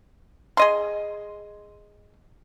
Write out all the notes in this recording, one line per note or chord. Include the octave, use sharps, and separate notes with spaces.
G#4 D#5 C6